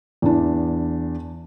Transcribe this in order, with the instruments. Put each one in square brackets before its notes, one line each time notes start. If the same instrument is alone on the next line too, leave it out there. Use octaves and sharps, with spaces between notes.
[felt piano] E2 D4